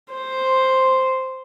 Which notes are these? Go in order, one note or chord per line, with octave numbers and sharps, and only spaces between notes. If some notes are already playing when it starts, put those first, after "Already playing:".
C5